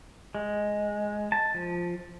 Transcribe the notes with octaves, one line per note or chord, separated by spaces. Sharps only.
G#3
A5
F3